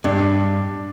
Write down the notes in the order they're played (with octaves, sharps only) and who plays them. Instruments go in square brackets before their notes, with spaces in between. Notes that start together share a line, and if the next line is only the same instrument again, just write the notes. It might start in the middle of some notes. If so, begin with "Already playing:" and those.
[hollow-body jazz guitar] G2 [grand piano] D4